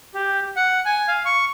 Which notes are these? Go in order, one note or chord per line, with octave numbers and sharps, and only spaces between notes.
G4
F#5
G#5
F5
C#6